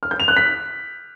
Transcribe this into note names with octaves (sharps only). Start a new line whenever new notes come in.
F6
G6
F7
F#6
B6